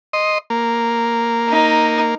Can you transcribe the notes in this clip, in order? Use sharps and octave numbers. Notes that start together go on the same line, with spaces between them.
D#5 C6
A#3
D#4